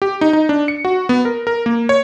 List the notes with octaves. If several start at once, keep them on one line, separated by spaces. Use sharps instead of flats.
G4
D#4
D#4
D4
C#7
F#4
B3
A#4
A#4
A#3
C#5